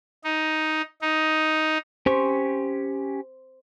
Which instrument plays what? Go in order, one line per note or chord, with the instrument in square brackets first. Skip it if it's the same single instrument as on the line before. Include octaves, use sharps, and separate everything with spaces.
[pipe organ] D#4
D#4
[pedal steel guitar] C#4 G4 C#6 [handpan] C5